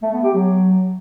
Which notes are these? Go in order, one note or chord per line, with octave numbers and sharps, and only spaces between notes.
A3
B3
G4
F#3